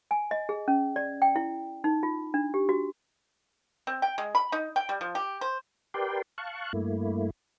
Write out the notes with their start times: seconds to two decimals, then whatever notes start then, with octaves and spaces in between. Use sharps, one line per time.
0.11 G#5
0.31 D#5
0.49 G#4
0.68 C#4
0.96 D5
1.22 G5
1.36 E4
1.84 D#4
2.03 F4
2.34 D4
2.54 G4
2.69 F#4
3.87 C4
4.02 G5
4.18 G#3
4.35 B5
4.52 D#4
4.76 G5
4.89 G3
5.01 F3
5.15 G4
5.41 C5
5.94 G4 A#4 B4 D5 G5 C6
6.38 F5 A5 C#6 F#6
6.73 G2 A3 A#3 E4